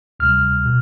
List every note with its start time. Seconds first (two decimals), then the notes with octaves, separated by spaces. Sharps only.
0.20 D2 C3 G3 F6
0.66 B2